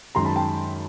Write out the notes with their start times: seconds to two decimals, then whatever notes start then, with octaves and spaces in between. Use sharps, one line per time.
0.15 F#2 D#3 G#3 A#5 C6
0.25 A5 B5
0.36 G5 A5